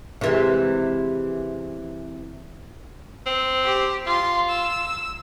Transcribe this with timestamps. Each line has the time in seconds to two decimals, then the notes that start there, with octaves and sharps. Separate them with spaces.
0.21 C3 E3 G#3
3.26 C4
3.64 G4
4.06 F4 C6
4.49 E6